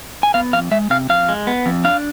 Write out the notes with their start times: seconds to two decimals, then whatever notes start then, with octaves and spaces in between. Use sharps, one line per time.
0.23 G#5
0.34 B3 F5
0.53 F2 F5
0.71 G#3 E5
0.90 C3 F5
1.09 F2 F5
1.29 G#3
1.47 B3
1.66 F2
1.84 D4 F5